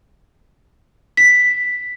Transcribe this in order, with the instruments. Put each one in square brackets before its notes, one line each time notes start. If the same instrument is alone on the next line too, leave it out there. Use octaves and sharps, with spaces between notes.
[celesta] B6